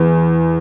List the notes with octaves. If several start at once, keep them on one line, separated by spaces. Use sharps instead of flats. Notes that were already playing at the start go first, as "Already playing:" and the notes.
Already playing: E2